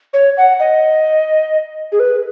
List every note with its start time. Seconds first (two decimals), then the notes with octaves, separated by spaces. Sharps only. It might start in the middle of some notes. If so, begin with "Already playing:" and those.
0.14 C#5
0.37 F#5
0.60 D#5
1.92 G#4
2.00 B4